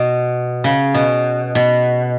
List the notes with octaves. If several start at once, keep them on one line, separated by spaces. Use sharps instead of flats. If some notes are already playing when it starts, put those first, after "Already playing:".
Already playing: B2
C#3
B2
B2